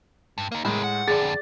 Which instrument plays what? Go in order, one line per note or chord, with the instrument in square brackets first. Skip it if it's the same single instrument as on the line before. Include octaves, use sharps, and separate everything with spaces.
[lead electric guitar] G2
A#3 D#4
[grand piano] A2 G#3 [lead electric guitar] E4 A#4
[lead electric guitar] F#5
[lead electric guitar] F2 D3 [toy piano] G#4 [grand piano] D5 A6